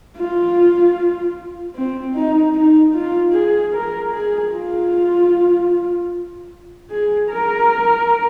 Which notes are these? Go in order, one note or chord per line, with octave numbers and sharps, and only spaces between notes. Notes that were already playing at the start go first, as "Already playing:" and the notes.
F4
C4
D#4
D#4
F4
G#4
A#4
G#4
F4
G#4
A#4